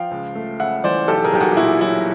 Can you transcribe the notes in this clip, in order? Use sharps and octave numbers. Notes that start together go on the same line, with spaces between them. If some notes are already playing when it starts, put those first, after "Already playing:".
Already playing: F3 F5 G5
C#2
A3
C#3 E5 F#5
E3 C5 D5
B1 G4 A4
G#4 A#4
B1 G4
F#4 G#4
G4
A#2 E4 F#4
F#3 E4